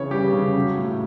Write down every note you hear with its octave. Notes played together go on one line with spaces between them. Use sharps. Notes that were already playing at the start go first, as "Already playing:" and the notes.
Already playing: C#3 E3 C#5
G3 G4
C#3
F#3
A2